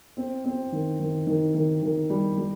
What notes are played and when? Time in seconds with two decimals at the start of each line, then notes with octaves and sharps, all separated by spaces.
0.17 C4
0.45 C4
0.72 D#3
1.00 D#3
1.27 D#3
1.54 D#3
1.82 D#3
2.10 G3
2.38 G3